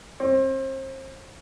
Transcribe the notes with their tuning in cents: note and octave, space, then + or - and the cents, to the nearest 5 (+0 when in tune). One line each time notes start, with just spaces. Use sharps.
C4 +35